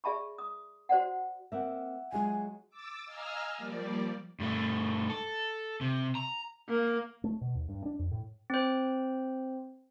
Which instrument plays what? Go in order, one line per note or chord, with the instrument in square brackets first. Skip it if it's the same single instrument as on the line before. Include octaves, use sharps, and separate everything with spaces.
[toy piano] G#4 D5 E5 A5 B5 C#6
D#6
F#4 C5 D5 F#5
[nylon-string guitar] A#3 C4 [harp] E5 F#5
[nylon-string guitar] F#3 G#3 F4 [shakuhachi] G#5
[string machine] D6 E6 A6
D#5 F5 G#5 A#5 E6 F6
F3 G3 A#3 D5
[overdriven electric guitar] G2 A3
A4
C3
A#5
[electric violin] A#3
[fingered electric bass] A3
B2
D#2
G2
D4
F2
A2
[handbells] C4 C5